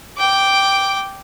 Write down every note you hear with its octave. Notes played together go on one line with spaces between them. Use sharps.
G5 D6